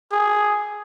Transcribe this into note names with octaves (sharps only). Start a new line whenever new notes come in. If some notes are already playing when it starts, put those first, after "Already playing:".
G#4